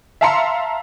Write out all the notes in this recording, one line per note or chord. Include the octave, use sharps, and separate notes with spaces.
E5 F5 A5 A#5 C6 C#7